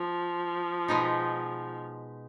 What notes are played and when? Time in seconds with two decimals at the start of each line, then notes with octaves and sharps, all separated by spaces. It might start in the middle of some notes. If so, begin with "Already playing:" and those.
Already playing: F3
0.88 B2 G#3 B3 D#4